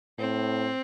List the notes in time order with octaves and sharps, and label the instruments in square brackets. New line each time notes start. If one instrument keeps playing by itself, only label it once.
[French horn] A2 [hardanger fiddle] C4